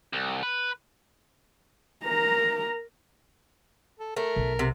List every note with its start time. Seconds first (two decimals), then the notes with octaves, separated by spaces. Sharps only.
0.13 C2
0.43 B4
2.04 A#4 A#5
4.00 A4
4.17 A3 A#4
4.36 B1
4.59 C3